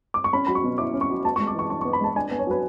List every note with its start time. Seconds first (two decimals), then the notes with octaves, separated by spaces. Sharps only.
0.14 D6
0.24 C#6
0.33 C#4 B5
0.47 F#3 B5
0.55 C#6
0.63 B2
0.78 E4 D6
0.93 C#4
1.01 C#6
1.10 F#3
1.25 B3 A5
1.36 C#6
1.40 G#3
1.47 D6
1.55 E3 C#6
1.70 D4 C#6
1.81 C#6
1.85 B3
1.93 B5
2.00 G#3 A5
2.16 D4 G#5
2.31 B3
2.39 C#5
2.47 F#3 B4